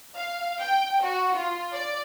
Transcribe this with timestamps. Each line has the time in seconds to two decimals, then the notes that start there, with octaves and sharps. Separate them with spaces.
0.15 F5
0.59 G5
1.02 F#4
1.35 F4
1.72 D5